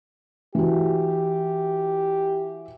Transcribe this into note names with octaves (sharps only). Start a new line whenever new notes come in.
E3 F#4 G4